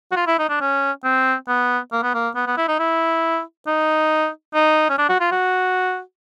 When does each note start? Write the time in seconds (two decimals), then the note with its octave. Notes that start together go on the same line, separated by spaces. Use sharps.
0.12 F#4
0.16 F4
0.27 E4
0.39 D#4
0.49 D4
0.61 C#4
1.04 C4
1.48 B3
1.92 A#3
2.03 B3
2.14 A#3
2.35 B3
2.47 B3
2.57 E4
2.68 D#4
2.79 E4
3.67 D#4
4.54 D#4
4.90 C#4
4.98 D4
5.09 F#4
5.20 F4
5.31 F#4